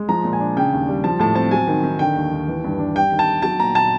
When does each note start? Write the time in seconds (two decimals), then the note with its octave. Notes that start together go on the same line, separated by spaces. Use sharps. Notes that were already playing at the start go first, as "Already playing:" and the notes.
Already playing: G#3
0.09 F3 A#5
0.24 A#2
0.33 G#5
0.40 D4
0.57 C#3 G5
0.73 D#2
0.88 G3
1.04 F3 A5
1.19 A2 A5
1.35 C4 A5
1.51 F#3 G#5
1.67 D#3
1.84 D#3
1.99 D3 G5
2.16 D#2
2.32 D#2
2.48 E3
2.64 G2
2.79 D4
2.95 G3 G5
3.12 D#3
3.19 A5
3.27 D#4
3.42 F#3 A5
3.59 A#2 A#5
3.75 A#2 A5